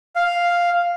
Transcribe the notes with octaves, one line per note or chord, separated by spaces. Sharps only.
F5